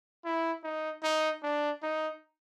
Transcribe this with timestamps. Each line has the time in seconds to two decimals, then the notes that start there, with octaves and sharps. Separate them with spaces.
0.24 E4
0.64 D#4
1.03 D#4
1.43 D4
1.83 D#4